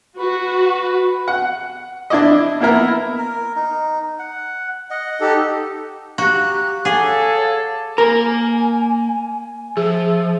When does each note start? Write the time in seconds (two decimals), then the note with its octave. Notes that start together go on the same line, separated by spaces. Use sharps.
0.19 F#4 B4
1.28 F#5
2.10 D4 E4 D5 D#5
2.60 A#3 B3 E4 A#4
3.18 A#4
3.56 D#4
4.19 F#5
4.90 D#5 F#5
5.21 D#4 G4 A4
6.18 F#4 G4 F5 A#5 F#6
6.85 G#4 A4 C#5 F5 F#5 D6
7.98 A#3 A#4 G#5 A#5
9.77 F3 G#4 E5